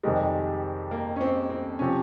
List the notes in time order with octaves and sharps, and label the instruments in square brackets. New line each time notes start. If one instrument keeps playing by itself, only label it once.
[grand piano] F2 C3 D#3 G#3 [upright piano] G3
[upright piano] A#3
C#4
C4
C4
[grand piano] C3 F3 [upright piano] C#4